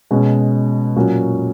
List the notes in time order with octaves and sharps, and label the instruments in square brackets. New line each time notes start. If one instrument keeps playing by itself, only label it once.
[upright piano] B2 G#3 C#4 F#4
A#2 F#3 C#4 F#4